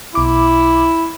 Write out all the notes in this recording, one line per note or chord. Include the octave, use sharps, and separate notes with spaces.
B1 E4 D6